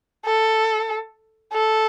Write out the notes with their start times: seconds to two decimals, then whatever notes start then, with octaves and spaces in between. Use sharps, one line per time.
0.25 A4
1.53 A4